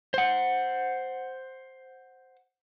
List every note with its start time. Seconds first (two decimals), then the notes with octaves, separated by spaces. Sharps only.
0.14 C5 F#5